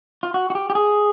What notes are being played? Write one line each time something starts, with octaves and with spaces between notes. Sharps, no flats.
F4
F#4
F#4
G4
G4
G#4